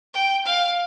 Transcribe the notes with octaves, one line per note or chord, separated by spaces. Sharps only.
G5
F5